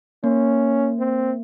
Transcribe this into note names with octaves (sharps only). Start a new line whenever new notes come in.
A#3 C#4
C4